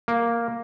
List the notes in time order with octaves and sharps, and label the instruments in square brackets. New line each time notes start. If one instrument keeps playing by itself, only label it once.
[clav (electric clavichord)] A#3